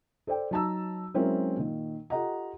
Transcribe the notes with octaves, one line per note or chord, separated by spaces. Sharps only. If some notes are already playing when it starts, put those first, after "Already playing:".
A4 C5 D5 G5
F#3 D#4 A5 A#5 E6
F#3 G#3 C4 C#4 E4 A#4
A#2 D#3
F4 G4 A4 D#5 F#5 A#5